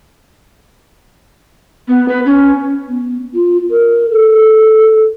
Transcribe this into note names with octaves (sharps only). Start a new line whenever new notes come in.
B3
B4
C#4
B3
F4
A#4
A4